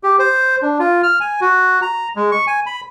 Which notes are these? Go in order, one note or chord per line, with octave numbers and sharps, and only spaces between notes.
G4
C5
D4
F4
F6
G#5
F#4
A#5
G#3
C#6
G#5
B5